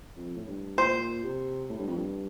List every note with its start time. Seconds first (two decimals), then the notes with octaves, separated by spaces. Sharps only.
0.17 F2
0.36 A2
0.47 G2
0.78 A#2 C5
1.23 C3
1.70 A2
1.79 G2
1.87 F2
1.96 G2